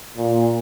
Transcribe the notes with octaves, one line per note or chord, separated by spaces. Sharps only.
A#2